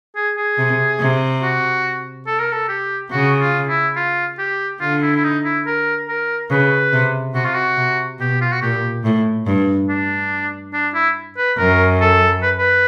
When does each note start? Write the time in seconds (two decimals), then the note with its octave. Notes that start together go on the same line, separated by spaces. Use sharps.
0.16 G#4
0.37 G#4
0.58 C3
1.00 C3
1.42 F#4
2.27 A4
2.40 A#4
2.52 A4
2.69 G4
3.12 C#3 F#4
3.40 F4
3.69 E4
3.96 F4
4.39 G4
4.81 D3 F4
5.02 E4
5.16 E4
5.24 D#4
5.45 E4
5.66 A#4
6.08 A#4
6.50 C#3 B4
6.93 C3
7.35 C3 F#4
7.45 F4
7.55 F#4
7.77 C3
8.19 B2 G4
8.42 F4
8.53 F#4
8.62 A#2 G4
9.04 A2
9.47 G2
9.89 D4
10.73 D4
10.94 E4
11.38 B4
11.58 F#2 A#4
12.01 A4
12.43 B4
12.59 B4